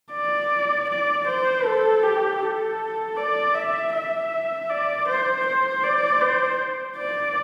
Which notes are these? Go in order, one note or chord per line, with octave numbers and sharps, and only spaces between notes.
D5
D5
C5
A4
G4
A4
D5
E5
E5
D5
C5
C5
D5
C5
D5